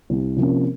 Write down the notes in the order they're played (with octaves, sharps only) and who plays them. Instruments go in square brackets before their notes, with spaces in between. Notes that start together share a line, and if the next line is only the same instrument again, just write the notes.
[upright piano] C2
C3 F3 A#3 C#4